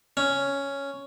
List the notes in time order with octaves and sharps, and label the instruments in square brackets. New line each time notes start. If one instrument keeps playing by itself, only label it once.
[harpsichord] C#4